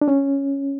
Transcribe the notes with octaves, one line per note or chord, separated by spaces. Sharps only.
D4
C#4